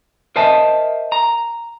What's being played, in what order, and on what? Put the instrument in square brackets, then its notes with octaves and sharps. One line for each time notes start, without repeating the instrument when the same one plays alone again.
[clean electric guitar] A#4 C5 D#5 E5 A5
A#5